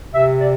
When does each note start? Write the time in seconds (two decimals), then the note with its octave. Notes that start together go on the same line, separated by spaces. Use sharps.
0.13 C3 E5
0.38 D5